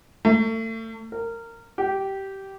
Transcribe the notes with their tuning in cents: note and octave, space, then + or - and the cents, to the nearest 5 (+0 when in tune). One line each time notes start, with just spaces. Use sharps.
A3 +35
A#4 -20
G4 -15